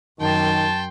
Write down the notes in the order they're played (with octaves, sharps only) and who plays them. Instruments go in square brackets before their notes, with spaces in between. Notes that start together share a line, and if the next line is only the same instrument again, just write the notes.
[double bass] F#2 [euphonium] D#3 [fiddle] G5 C6 [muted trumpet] A5